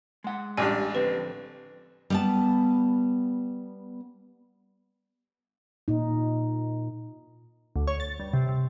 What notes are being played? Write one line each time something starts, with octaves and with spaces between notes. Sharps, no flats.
G#3 F#5
A1 G3 D4 G#5
F2 D3 C4 B4
G3 B3 A5
A#2 D#4
D2
C#5
A6
G2
C3
C3